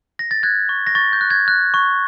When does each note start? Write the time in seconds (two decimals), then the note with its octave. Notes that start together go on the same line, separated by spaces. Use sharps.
0.19 A#6
0.31 A6
0.43 F#6 G#6
0.69 C#6
0.87 A#6
0.95 C#6 A6
1.13 G6
1.21 F#6
1.30 G#6
1.48 F#6
1.74 C#6